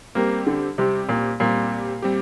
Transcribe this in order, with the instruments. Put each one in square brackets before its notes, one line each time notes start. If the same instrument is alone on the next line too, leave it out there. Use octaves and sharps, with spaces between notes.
[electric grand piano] G3 C4 G4 [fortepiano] A#3
[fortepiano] D3
[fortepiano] C3 [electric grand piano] G3 C4 G4
[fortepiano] A#2
[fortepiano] A#2 [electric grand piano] G3 C4 G4
[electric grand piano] G3 C4 G4